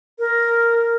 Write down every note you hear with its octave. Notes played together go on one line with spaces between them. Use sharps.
A#4